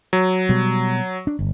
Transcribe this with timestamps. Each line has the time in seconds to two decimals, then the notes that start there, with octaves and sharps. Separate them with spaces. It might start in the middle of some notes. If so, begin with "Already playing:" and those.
0.13 F#3
0.49 B2 G3
1.27 D4
1.39 G1